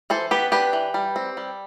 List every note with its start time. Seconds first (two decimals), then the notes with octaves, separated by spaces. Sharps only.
0.10 E3 A4 C5
0.31 B3 G4 B4
0.52 D4 G4 B4
0.73 E3
0.94 G3
1.16 C4
1.37 G3